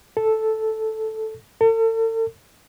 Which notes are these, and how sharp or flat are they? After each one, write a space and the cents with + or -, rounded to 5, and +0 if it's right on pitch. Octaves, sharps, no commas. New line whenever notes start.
A4 -5
A4 +40